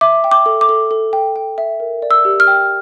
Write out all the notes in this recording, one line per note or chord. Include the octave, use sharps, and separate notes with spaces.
E5 D6
G5
D6
A4
D6
A4
A4
G5
G5
E5
A#4
D5
E6
G4
F6
G5